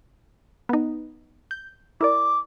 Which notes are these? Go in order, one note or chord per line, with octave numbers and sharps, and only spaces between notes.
B3 D#4
G6
E4 A#4 D5 D6